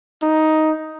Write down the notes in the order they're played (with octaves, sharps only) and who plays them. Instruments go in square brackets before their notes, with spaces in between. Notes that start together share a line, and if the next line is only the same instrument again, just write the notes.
[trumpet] D#4